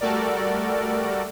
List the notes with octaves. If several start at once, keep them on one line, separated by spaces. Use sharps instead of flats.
G3 A3 F#4 A4 A#4 D5